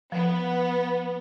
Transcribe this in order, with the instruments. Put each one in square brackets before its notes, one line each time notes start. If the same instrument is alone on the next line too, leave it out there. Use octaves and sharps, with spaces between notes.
[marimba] F3 [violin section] B3